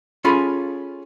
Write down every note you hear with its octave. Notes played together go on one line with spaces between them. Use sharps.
C#4 F4 G#4 A4 B5